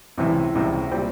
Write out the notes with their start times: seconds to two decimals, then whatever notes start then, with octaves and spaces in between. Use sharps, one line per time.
0.17 C#2 C3 E3
0.55 C#2 C3 E3
0.91 A#2 G3 C4